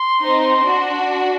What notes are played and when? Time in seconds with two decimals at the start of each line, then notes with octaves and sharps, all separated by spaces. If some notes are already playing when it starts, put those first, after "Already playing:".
Already playing: C6
0.22 C4 D#4
0.66 D4 F#4